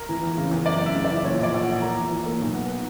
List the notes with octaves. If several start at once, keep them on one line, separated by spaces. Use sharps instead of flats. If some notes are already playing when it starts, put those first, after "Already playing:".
Already playing: A#4
E3
E2
C#3
E2
F#1 D5
C#3
E5
C#3
E2 D5
A#2 C#5
A#1 D5
A#1
F#5
A#2
A#3 A#5
E2
E2
A#3
B1
B3